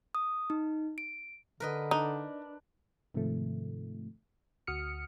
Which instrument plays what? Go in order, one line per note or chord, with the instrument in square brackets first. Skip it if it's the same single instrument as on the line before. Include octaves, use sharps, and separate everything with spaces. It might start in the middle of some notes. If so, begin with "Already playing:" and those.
[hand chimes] D#6
D#4
D7
[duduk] D3 [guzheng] A#4 B4 D#5
[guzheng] D4 [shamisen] D#4
[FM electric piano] G#2 C3 D#3 F3 A3
D2 F#4 D#6 F6 C#7